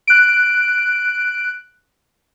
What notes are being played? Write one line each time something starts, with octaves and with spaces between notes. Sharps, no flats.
F#6 D7